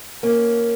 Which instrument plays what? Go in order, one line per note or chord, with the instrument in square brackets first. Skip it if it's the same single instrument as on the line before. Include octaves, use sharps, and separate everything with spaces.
[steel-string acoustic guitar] A#3 C#4